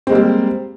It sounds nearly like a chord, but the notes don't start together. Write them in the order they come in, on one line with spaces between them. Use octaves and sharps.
C4 G#3 A#3 G3